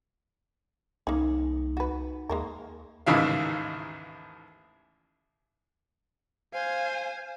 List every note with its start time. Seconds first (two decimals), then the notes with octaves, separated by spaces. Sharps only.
1.07 C2 A#3 C#4 D#4
1.77 F#4 B4
2.29 D#2 G#3 A#3 A#4
3.06 A1 D#2 G#2 C#3 E4 F5
6.54 C5 F5 G#5